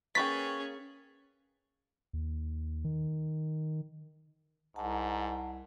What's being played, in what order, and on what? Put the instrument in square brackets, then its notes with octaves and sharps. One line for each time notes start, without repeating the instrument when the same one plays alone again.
[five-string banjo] A#3 B4 G5 [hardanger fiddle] C#4 G#4 [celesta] C#6 A6 [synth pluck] B6
[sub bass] D#2
D#3
[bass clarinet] C2 [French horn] G#2 [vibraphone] F#5 A5 A#5